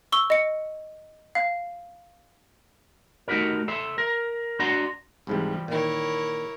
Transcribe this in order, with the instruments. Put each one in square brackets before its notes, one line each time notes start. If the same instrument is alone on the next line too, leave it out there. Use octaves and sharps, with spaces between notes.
[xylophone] C#6 E6 G7
D#5 C#7
F5
[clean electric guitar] A3 D#4 F#4 G4 A#4
A4 C5 E5
A#4
D4 F#4 D5 F#5 A#5 C6
[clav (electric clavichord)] C2 G#2 C3 [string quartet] E3 F3 G3
[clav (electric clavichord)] A#2 D#3 [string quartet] E4 A#4 C#5